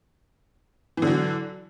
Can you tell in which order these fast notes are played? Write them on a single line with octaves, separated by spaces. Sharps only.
E3 D3 F#3